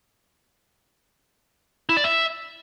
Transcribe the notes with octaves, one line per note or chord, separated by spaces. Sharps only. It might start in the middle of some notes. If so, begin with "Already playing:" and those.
E4
D5
E5